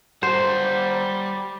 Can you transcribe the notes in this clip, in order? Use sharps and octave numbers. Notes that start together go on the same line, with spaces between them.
G3 C5 F#5